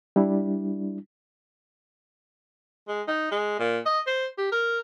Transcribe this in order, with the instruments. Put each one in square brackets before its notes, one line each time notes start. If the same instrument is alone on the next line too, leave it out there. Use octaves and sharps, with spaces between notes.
[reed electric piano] G3 D4 E4
[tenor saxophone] G#3
D#4
G#3
A#2
D#5
C5
G4
A#4